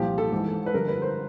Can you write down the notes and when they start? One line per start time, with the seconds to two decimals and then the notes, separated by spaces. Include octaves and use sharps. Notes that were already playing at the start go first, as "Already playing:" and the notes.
Already playing: C2 A#2 F3 G4
0.18 A4
0.32 G#2 E3
0.66 B4
0.74 G2 D3 F3 A#4
0.88 B4
1.02 C5